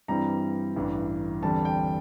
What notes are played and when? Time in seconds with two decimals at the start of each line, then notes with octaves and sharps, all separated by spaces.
0.08 G2 E3 G3 C4 A#5
0.76 A1 G2 E3
1.42 E2 D3 G3 C4 A5
1.65 G5